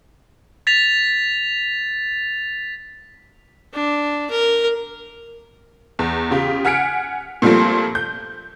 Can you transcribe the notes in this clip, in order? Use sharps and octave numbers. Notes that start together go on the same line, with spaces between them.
A6 B6 F7
D4
A#4
E2
C#3 F4 G4
F#5 G#5 F6 B6 C#7 D7
A#2 F3 G3 A3 C4
G6